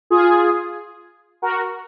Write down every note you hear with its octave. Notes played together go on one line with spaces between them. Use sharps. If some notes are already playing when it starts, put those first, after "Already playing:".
F4 G#4
F#4 A#4